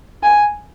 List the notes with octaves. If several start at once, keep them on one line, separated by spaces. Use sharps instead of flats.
G#5